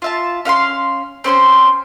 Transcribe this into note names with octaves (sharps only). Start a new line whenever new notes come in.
F4 E5 A5
C#4 F5 F#5 C6
C4 C#4 C5 C6